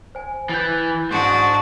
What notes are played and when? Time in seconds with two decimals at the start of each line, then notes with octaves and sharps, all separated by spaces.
0.15 C5 G#5
0.49 E3 G6 A6
1.11 G#2 D4 F#4 C6 C#6 C#7